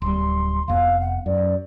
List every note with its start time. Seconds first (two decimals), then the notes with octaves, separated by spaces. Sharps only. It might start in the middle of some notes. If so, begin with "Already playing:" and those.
0.02 D1 G3 C6
0.68 F1 F2 B3 F5
1.01 F#5
1.26 F#2 D5